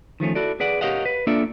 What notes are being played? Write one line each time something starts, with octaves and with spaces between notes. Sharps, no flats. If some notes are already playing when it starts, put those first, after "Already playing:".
D#3 F3 A3 C#4
E4 F#4 A4 D5
G#4 B4 D5 F#5
G4 A#4 C#5 D#5 F5 F#5
B4
A#3 D4 F4 A4 D5 E5